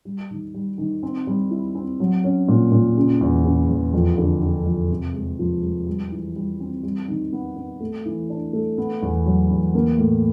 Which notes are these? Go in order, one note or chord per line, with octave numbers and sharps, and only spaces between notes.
G3
D#3
G3
D#3
C4
G3
E4
C4
F#3
C#4
A#2
A#2
C#3
E2
C#3
E2
F2
D3
D3
F2
C3
G#3
F3
G#3
G3
E3
G3
C4
G3
D#3
B3
B3
A3
E3
D4
A3
B3
E2
F#3
E2
A#3
A2